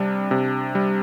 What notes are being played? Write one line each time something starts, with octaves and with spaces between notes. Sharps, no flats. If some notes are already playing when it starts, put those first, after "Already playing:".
Already playing: C3 G3 D4
C3
G3